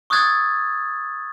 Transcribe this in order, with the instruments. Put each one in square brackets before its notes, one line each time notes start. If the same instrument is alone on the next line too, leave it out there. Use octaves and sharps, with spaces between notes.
[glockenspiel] C#6 D#6 E6 F#6 G#6 A6